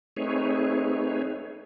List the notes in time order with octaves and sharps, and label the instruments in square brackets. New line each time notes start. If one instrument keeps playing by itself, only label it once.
[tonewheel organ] A3 C4 D#4 G#4 B4 C#5